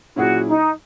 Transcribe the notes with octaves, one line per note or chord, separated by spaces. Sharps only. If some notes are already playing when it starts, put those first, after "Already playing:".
A#2 F#3 C#4 E4 F#4 G#4
D#4